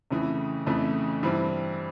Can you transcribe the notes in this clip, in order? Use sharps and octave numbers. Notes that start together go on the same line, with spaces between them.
F2 C#3 E3 A3
F2 C#3 E3 A3
G2 E3 G3 C4